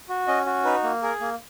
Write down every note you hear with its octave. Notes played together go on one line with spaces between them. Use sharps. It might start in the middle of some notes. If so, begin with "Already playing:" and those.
F#4
C#4 D#5
F#4
D#4 B4
A#3
G#4 A#4
A#3